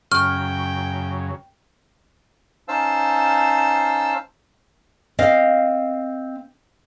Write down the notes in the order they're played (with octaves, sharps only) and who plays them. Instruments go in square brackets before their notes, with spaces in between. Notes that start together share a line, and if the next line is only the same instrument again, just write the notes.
[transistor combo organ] F#2 C#3 [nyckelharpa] G5 [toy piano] C#6 [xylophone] F6
[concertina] C#4 D#4 C5 F5 A5 E6
[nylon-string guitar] C4 D#5 F5